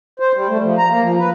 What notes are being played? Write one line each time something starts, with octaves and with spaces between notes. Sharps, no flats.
C5
G3
A3
F3
A#5
A#3
F3
B4